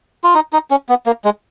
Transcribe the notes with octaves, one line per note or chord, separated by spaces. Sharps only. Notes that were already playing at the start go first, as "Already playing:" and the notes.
F4
D#4
D#4
C#4
B3
A#3
G#3